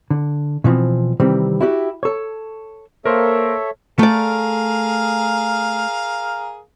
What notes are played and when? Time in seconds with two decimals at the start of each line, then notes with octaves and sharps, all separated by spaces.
0.10 D3
0.64 B2 E3 F3 C4
1.20 C3 D#3 E3 G3 C4
1.61 E4 F#4 G4
2.03 A4 C#5
3.06 A#3 A4 A#4 C5 C#5 E5 C6
3.99 A3 G#4 A#4 D5 F5